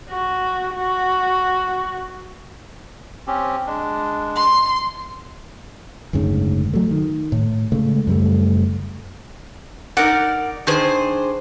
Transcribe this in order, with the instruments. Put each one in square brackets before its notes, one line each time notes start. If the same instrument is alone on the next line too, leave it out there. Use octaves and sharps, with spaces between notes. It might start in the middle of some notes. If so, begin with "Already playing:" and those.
[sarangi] F#4
F#4
[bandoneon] C4 C#4 G4
G#3 D4
[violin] C6
[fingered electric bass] F#1 D2 G#2 C#3
F#3 A3
D#3
A2
C#3 G#3 A3
F#2 C#3 G3 A3
[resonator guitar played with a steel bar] D#4 A#4 F#5 [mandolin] D5
[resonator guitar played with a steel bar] D#3 [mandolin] D4 G#4 C5